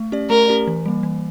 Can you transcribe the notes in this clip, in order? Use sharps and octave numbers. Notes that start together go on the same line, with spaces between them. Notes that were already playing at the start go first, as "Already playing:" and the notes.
Already playing: A3
C#4 G4 D5
A3 A#4
C#4 G4 D5
E3
G3 A#3
E3